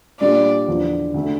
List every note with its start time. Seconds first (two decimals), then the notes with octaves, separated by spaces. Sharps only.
0.20 A#2 G3 D4 D5
0.68 E2 D3 F3
1.14 D2 D3 A3